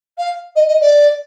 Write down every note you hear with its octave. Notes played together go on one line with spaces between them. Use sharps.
F5
D#5
D#5
D5